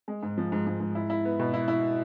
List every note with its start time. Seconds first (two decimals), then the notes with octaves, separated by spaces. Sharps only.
0.08 G#3
0.23 G#2
0.38 F3
0.52 G#2
0.67 G#2
0.80 G#2
0.95 E4
1.10 E4
1.25 B3
1.40 B2
1.54 E4
1.68 E4